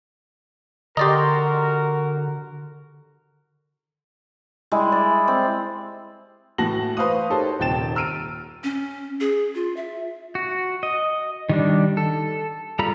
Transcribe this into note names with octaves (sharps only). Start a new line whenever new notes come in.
D3 F#4 G4 A#4 D5 D#5 A#5 C6
G3 G#3 E4
D5
C4
A2 E3 F#4 A5 A#6 F#7
B4 C5 F5 C#6 D#6
D#4 G4 A4 A#4 C5 C#5
D#1 C3 G5 A6 E7
A#5 E6 F6 D7 D#7
C#4
G#4
F4
E5
F#4
D#5
D#3 G3 D4
A4
G3 F4 A4 A#5 B5